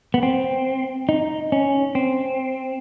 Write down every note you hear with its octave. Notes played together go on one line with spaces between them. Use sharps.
B3
C4
D#4
C#4
C4